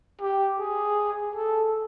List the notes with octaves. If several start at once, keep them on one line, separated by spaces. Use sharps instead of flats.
G4
G#4
A4